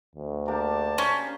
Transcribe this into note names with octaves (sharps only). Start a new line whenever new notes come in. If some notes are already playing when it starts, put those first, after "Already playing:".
D2
A#3 D4 G4 A5
C#4 C5